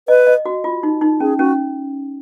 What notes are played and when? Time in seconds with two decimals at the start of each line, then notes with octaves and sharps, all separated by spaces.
0.08 B4 D#5
0.27 D#5
0.46 F#4
0.64 F4
0.83 D#4
1.01 D#4
1.20 C#4 G#4
1.39 C#4 F#4